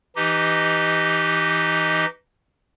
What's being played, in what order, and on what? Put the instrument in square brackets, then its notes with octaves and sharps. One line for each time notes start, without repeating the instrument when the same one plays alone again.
[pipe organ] E3 D#4 G4 D#5